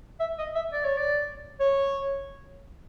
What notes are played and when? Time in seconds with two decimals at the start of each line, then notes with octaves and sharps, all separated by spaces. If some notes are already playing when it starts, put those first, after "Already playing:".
0.20 E5
0.38 D#5
0.55 E5
0.73 D5
0.85 C#5
0.97 D5
1.60 C#5